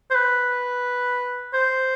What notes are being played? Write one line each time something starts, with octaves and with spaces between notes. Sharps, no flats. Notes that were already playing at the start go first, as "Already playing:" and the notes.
C5
B4
C5